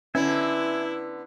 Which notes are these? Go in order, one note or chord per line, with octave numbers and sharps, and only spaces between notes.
D3 B3 C#4 E4 E5 G#5